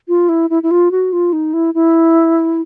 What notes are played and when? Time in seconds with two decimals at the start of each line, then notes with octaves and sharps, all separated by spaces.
0.08 F4
0.29 E4
0.50 E4
0.63 E4
0.71 F4
0.91 F#4
1.13 F4
1.33 D#4
1.54 E4
1.74 E4